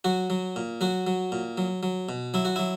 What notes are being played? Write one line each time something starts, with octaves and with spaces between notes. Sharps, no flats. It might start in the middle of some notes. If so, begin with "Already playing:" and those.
F#3 F#4
F#3
A#2
F#3 F#4
F#3
A#2
F#3
F#3
B2
F#3 E4
F#4
F#3 E4